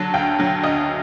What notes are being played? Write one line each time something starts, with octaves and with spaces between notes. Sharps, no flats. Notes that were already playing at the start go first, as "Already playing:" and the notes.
Already playing: D3 F#3 A5
D2 G5
D3 F#3
D2 D#5